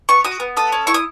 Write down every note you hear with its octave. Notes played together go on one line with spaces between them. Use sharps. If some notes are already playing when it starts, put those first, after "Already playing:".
B3 C#6
F#4 D#6
B3
A4 D#6
C#4
E4 C#6
D#6